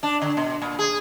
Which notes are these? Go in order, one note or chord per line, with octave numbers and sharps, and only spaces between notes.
D4
D3
B2
A#2
G#4